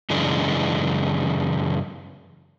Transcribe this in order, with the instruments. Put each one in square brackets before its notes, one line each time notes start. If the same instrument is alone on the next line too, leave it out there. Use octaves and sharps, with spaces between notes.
[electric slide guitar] F#2 C#3 E3 G#3 D4